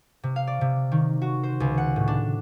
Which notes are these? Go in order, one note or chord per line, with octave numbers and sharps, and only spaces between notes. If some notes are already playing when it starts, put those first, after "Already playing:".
C3
F5
D5
C3
D#3
F#4
C5
C#2
F#5
A2
D4